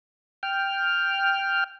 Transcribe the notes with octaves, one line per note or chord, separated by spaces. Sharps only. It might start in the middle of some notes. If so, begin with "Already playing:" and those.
G5 F6